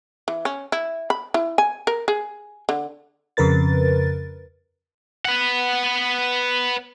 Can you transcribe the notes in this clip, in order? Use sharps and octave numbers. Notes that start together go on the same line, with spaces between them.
E3
C#4
E4
B5
E4
G#5
A#4
G#4
D3
F2 C#3 A#4 B4 A6
B4 F#5